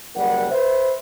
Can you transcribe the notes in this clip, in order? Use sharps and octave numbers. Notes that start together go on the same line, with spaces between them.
F#1 G3 A#4 F#5
B4 C5 E5